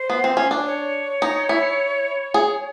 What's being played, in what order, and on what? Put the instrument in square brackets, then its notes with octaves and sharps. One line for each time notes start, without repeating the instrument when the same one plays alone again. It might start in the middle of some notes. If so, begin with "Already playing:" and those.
Already playing: [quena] C5
[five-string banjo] B3
C4
C#4
D4
[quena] C#5
[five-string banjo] D#4
E4
G#4